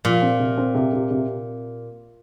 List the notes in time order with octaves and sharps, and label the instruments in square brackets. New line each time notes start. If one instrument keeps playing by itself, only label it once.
[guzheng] A#2 [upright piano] F3
[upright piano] C4
C3
C4
C3
C3
C3